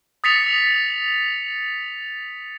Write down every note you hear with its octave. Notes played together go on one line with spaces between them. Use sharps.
D#6 A6 B6 C#7 F7